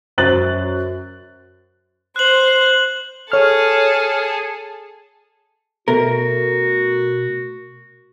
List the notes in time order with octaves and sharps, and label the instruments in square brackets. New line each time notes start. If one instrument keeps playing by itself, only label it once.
[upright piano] F#2 C5 F#6 A6 F#7
[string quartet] C5 [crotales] F#6 F#7
[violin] G#4 A4 [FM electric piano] C#5 F6
[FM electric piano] B2 A3 [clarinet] F#4 [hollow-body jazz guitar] A#4